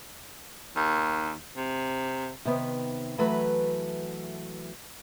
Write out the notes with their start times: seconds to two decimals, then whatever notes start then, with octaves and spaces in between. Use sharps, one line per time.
0.76 D#2
1.56 C3
2.45 C3 D#3 B3
3.18 E3 F#3 A3 B4